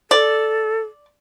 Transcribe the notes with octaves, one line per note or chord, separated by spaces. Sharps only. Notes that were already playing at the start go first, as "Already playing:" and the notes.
A4 D5